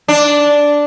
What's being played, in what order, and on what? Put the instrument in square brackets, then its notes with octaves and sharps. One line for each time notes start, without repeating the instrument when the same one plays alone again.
[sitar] D4